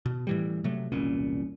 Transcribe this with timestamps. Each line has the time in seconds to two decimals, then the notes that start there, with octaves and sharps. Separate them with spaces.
0.06 B2
0.27 A2 E3 G3
0.64 C3 F#3 A3
0.92 E1 C2 A#2 C#4